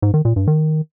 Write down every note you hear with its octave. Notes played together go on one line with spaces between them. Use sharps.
G#2
D#3
A#2
G2
D#3